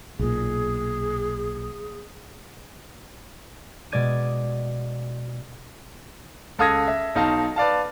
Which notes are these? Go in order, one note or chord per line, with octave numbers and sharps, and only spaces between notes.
B1 A#2 G#4
B2 G#3 D5 G#6 D#7
C#2 A4 F5 D#6 G#6 A#6
E5
B1 D#4 F5 A5
B4 D5 F5 A5